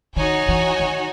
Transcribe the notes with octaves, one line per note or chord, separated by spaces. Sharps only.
D#3 D#4 F#4 C#5 G#5
E3
D#3